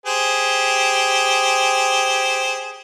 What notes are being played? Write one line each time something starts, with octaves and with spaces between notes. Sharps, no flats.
G4 G#4 C5